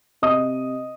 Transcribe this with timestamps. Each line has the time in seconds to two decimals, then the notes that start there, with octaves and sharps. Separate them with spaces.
0.22 C3 D#5 D#6